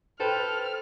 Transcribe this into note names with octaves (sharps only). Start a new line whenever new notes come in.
A4 B4 C5 G5 F6